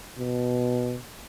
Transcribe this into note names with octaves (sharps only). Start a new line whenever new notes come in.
B2